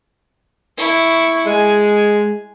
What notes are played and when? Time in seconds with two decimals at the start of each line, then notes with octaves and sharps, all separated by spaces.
0.78 E4 C#6
1.46 G#3 G#5